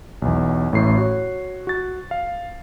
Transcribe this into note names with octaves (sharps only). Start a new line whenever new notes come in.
B1 E2
A1 A2 C7
F#4 C#5
F#4 A6
F5